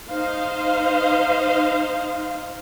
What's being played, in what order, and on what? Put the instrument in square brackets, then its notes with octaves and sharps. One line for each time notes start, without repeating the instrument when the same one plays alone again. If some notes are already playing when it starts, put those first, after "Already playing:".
[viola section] D#4 C5 F5